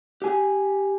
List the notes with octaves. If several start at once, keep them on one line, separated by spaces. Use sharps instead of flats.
G4 G#5